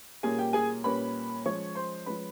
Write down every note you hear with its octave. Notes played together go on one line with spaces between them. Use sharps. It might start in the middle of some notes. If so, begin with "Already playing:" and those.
A#2 G3 A#3 C#4 G#4 G#5
G4 G5
G#4 G#5
A#2 G3 A#3 C#4 B4 B5
F3 G#3 C#4 C#5 C#6
C5 C6
F3 G#3 C#4 B4 B5